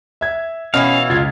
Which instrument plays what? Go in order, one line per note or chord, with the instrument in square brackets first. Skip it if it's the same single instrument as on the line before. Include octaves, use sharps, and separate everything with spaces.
[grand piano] E5 G#6
[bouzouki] B2 E3 E4 [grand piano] C#4 [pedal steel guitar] F5
[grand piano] C#2 G#6 [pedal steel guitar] F4